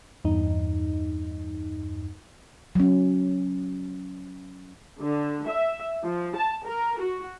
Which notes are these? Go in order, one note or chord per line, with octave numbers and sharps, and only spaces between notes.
E2 G2 D#4
F#3 C#4
D3
E5
F3
A5
A#4
F#4